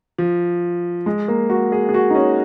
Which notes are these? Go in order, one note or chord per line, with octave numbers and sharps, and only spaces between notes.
F3
G#3
A#3
F#4
G#4
G#4
F#4
D#4
C#4